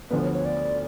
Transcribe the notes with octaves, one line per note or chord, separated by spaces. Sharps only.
D2 D3 F3 B3 B4
C#5
C#5
D5